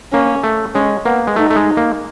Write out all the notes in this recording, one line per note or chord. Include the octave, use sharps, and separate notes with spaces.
A#3 C#4
A3
G#3 C#4
A#3 B3
G#3
A3 D#4
A3
G#3
A#3